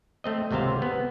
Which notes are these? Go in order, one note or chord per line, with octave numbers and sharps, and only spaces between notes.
A3 C4 D#5
G#1 C#2 C3 C4 C5 F5
B3